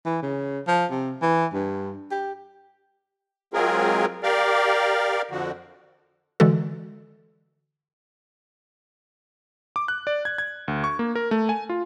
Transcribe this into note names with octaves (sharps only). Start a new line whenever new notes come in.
E3
C#3
F3
C3
E3
G2
G4
F#3 G#3 C4 F4 G#4 A#4
G4 A#4 D5 F5
F2 D3 F3 F#4
D3 E3 G#3 F#4 A4
D6
F#6
D5
G#6
G#6
D2
C#6
A#3
A#4
A3
G#5
F4